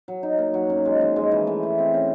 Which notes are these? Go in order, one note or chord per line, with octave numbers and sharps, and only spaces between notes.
F#3
D#4
A#3
F#3
F#2
G#3
F3
G#3
E3
A3
A3
C4
C#4